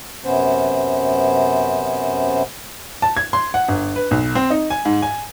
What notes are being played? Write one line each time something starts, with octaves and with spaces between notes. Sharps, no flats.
F#2 C3 B3 C#4 C5
A5
G#6
C6
F#5
G1
B4
B1
C4
D#4
G#5
G#2
G#5